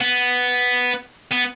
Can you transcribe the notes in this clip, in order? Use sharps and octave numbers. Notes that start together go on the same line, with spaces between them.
B3
B3